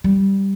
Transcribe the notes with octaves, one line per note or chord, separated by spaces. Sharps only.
G3